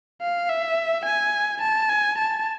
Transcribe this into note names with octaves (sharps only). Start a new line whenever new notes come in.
F5
E5
G#5
A5
G#5
A5